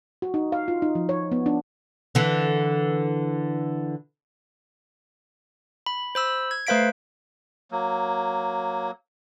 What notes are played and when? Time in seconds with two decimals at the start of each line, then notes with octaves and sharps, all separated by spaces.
0.22 F#4
0.34 D#4
0.52 F5
0.68 F4
0.82 D#4
0.95 F3
1.09 C#5
1.32 B3
1.46 D4
2.15 D3 E3
5.86 B5
6.15 C5 B5 E6
6.51 G#6
6.67 A3 B4 C5 F5 B6 D7
7.71 F#3 A#3